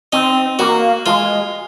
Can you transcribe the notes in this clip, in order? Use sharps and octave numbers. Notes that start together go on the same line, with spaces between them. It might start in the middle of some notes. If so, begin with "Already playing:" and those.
C4 D#4
A#3 F#4
G#3 F4